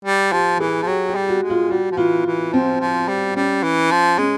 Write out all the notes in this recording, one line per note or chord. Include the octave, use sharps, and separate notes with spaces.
G3
F3 G4
E3 G#4
F3
F#3 G4
G4
G3
F#4
G#3
F4
G3 F#4
F3
E3 F4
E3
F3 C4
F3
G3
G3 C#4
E3
F3
G#3 C#4